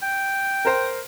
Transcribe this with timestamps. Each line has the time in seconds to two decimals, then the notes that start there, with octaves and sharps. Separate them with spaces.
0.03 G5
0.65 A#4 C5